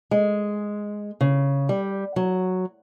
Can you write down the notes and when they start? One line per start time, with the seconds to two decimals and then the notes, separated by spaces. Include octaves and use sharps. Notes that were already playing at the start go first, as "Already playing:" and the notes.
0.11 G#3
1.21 C#3
1.69 G3
2.16 F#3